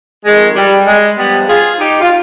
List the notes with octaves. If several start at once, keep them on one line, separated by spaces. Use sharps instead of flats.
F2 D#3 G#3
G3
G#3
G2 F3 G3 B3
F4 G#4
D#4 G4
F4